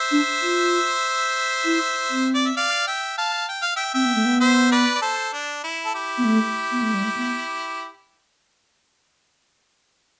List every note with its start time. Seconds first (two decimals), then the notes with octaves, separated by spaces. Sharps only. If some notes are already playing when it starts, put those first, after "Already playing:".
Already playing: C5 E5
0.12 D4
0.42 F4
1.65 E4
2.10 C4
2.34 D5
2.46 E5
2.57 D5 F5
2.87 E5 G5
3.18 F5 A5
3.49 G5
3.62 F5
3.76 E5 G5
3.94 C4 E5 G5
4.05 B3
4.15 A3
4.26 B3
4.41 C5 E5
4.72 B4 D5
4.95 D5
5.02 A4 C5
5.33 D4
5.64 E4
5.85 A4
5.95 E4 G4
6.18 B3
6.25 A3
6.72 B3
6.82 A3
6.94 G3
7.04 A3
7.17 B3